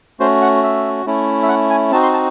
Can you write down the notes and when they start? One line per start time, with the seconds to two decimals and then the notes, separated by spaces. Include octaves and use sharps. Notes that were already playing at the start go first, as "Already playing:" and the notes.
0.20 A3 C#4 F#4 C5
0.42 F#5
0.63 E5
1.05 A3 C#4 E4
1.43 E5
1.49 F#5
1.70 G#5
1.91 C4 D#4 F#4 A5
2.03 C6
2.13 A5